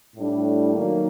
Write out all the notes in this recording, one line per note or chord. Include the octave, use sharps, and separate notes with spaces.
A2 G3 D4
D#3 F#3 A#3